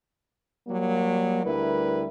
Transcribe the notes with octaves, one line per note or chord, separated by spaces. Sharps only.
F#3 G3 A#3
D2 G3 E4 A#4 B4